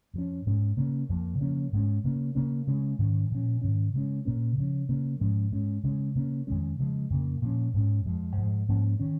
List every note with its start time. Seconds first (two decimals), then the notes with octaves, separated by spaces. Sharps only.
0.13 F2 F3 C#4
0.46 G#2 G#3 C#4
0.77 C#3 A#3 C#4
1.09 F2 F3 A#3
1.40 C#3 F3 A#3 C#4
1.72 G#2 G#3 C#4
2.04 C#3 A#3 C#4
2.35 C#3 A#3 C#4
2.67 C#3 G#3 C#4
2.99 G#2 D#3 C#4
3.31 A#2 F3 C#4
3.61 G#2 D#3 C#4
3.94 C#3 G#3 C#4
4.25 A#2 A#3 C#4
4.57 C#3 F3 C#4
4.89 C#3 A#3 C#4
5.20 G#2 F3 G#3 C#4
5.52 G#2 G#3 C#4
5.83 C#3 G#3 C#4
6.15 C#3 A#3 C#4
6.47 F2 D#3 G#3 C#4
6.79 C#3 F3 G#3
7.10 F2 C#3 A#3
7.42 A#2 F3 C#4
7.74 G#2 G#3 C#4
8.05 F2 F3 G#3
8.37 G#2 F3 G#3
8.69 G#2 F3 A#3 C#4
9.00 D#3 C#4